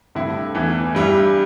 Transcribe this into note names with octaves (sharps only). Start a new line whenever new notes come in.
G2 D3 A3 C4 E4
E2 E3 A3
G2 G3 E4